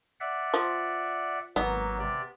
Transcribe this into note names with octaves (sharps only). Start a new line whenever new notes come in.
D5 E5 F#5
F3
G#1 F#3 A#3 B3
C3 D5